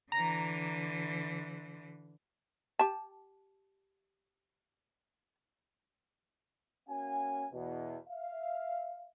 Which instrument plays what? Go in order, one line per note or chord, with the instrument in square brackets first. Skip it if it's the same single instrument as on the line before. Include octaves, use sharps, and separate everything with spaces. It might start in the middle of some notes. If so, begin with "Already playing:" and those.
[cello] D3 E3 [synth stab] A#5
[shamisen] G4 A5
[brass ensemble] A#3 C#4 F#4 F5 G#5
E2 B2
E5 F5